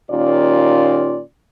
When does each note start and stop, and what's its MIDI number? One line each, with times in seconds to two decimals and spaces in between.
0.10 1.20 39
0.10 1.20 46
0.10 1.20 61
0.10 1.20 65
0.10 1.20 74